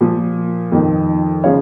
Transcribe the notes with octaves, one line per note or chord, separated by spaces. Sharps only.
A#2 F3
F2 D#3
C#3 F3 C#5 F5